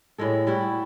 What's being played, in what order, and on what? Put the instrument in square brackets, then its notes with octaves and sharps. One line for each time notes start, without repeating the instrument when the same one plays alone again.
[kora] A2 G3 G#3 A4
G3 E4 F#4